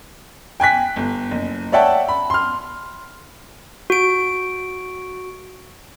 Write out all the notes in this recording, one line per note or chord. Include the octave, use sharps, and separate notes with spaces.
G5 G#5 F#6 B6
G1
F#1
C#5 D5 E5 F#5 G5 A5
B5
C6 F6
F#4 D7